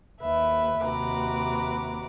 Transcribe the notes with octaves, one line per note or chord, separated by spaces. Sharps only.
D#2 B4 E5
D#2 C3 F#4 B4 A#5 D6